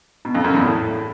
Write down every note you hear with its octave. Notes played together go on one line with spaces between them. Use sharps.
B2
F2
F#2
E2
A2